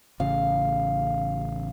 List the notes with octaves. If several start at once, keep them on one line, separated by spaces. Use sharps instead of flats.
A1 C#3 F5